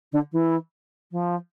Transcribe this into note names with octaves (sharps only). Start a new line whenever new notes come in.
D3
E3
F3